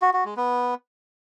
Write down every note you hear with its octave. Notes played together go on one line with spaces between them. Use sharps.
F#4
F#4
G#3
B3